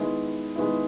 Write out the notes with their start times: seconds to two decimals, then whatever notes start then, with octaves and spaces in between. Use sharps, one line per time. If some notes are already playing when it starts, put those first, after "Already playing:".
Already playing: D#3 G#3 B3 E4
0.56 D#3 G#3 B3 E4